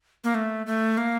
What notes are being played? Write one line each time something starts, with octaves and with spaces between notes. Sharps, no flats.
A#3
A3
A3
A#3